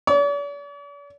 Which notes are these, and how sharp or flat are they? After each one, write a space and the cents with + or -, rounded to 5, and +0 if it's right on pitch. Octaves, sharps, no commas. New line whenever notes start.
D5 -45